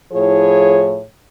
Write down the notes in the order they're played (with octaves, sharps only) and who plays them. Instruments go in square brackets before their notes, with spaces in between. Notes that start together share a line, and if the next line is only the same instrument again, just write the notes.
[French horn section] A2 F3 E4 G#4 C#5